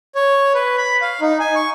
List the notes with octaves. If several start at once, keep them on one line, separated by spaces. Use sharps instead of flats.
C#5
B4
B5
F5
D#4
G#5
C#6